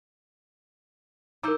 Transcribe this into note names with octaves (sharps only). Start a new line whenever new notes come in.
E3 D#4 A#4 A#5 D6 E6 G6